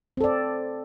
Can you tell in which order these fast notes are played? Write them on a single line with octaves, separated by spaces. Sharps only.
C4 A4 D5